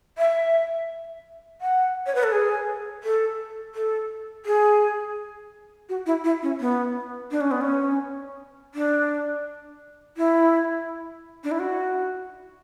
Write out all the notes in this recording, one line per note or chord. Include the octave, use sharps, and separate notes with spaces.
E5
F#5
C#5
B4
A4
G#4
A4
A4
G#4
F#4
E4
E4
C#4
B3
D4
C#4
B3
C#4
D4
E4
D4
E4
F#4